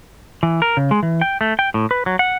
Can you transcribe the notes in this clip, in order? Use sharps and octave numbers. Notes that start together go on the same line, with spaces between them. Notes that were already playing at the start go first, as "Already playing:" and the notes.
E3
A#4
C#3
G#3
E3
G5
A3
G5
A2
B4
F#3
F#5